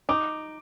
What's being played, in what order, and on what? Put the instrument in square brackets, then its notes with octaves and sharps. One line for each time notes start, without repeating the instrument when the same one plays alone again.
[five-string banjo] D#4 [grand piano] D6